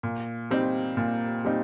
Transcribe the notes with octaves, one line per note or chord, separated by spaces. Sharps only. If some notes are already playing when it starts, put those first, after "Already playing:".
A#2
G3 C4 D#4
A#2
G3 C4 D#4